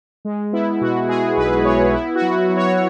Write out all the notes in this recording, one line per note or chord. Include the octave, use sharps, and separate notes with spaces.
G#3
B3 E4
B2 F#4
G#3 G#4
B1 B4
B3 C#5
B3 E4
F#4
F#3
F#3
C#5